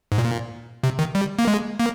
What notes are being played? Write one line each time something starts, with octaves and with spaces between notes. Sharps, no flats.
G#2
A#2
C3
D#3
G3
A#3
G#3
A#3